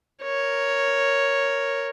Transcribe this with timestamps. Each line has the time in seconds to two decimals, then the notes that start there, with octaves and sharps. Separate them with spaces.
0.23 A#4 C#5